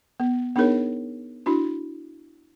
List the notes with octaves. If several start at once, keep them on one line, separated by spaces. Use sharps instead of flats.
B3
B3 D4 D#4 G#4 A#4 C#5
D4 E4 F#4